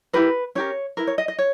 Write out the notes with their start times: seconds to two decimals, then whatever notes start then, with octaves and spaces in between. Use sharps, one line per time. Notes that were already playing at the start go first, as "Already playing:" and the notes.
0.13 E4 G4 A#4 B4
0.55 C#4 G4 A#4 C#5
0.97 E4 A#4 B4
1.07 C#5
1.18 D#5
1.28 D#5
1.38 C#5